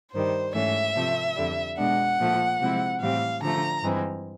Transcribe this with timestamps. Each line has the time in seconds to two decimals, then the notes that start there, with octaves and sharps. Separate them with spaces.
0.13 G2 D#3 G3 C5
0.54 G#2 E3 A3 C#4 E5
0.96 C3 F3 A3
1.36 F2 D3 G3
1.77 B2 G#3 B3 D4 F#5
2.19 A#2 F3 A3
2.60 C3 F3 G#3 C4 E4
3.01 A2 E3 G3 C4 F5
3.42 D3 F3 A3 A#5
3.82 G2 E3 G#3 C4